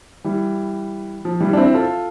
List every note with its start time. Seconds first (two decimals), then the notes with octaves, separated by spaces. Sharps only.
0.24 E3 G3
1.25 F3
1.40 E3 G3
1.53 D4
1.57 C4 E4
1.74 F4 A4